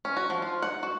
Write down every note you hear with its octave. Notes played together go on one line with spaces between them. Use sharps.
C#4
F#4
F3
F4
F#5
F#4